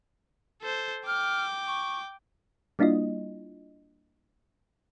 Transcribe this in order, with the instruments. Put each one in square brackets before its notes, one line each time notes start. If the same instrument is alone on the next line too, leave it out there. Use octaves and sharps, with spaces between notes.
[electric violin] A4 C5
[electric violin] G5 D6 [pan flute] F6
[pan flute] C#6
[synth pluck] G3 A#3 D4 E4 F4 D#5